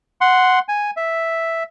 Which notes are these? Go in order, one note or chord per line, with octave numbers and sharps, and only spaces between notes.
F#5 C6
G#5
E5